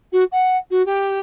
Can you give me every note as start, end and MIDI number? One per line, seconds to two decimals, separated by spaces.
0.12 0.24 66
0.31 0.57 78
0.70 0.85 66
0.85 1.19 67